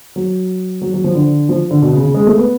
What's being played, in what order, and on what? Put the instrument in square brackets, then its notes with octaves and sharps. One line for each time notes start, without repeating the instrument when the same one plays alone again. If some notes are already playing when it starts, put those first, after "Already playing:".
[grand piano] F#3
F#3
F#3
F3
D3
F3
D3
B2
C#3
C#3
G#3
A3
B3